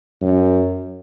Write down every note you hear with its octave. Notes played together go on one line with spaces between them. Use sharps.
F#2